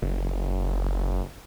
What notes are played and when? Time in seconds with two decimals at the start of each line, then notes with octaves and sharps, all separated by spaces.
0.02 F#1